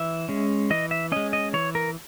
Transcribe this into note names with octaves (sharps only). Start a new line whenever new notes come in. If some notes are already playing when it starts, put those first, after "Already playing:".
Already playing: E3 E5
G#3 C#4
E3 D#5
E5
G#3 C#4 D#5
D#5
E3 C#5
A#4